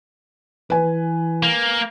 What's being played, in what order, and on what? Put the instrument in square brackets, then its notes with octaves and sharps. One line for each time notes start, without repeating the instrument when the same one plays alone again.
[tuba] E3 [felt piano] B4 G#5
[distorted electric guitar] A#3